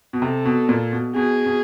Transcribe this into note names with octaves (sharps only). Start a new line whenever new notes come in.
B2
C3 A4
B2
A#2
B2
B2 G#4
B2